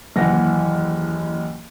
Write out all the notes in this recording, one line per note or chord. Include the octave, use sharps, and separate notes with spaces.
F#1 D#2 E3 F#5 A#6